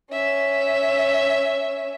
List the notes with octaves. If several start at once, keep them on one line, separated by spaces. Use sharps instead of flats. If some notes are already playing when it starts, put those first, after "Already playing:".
C#4 E5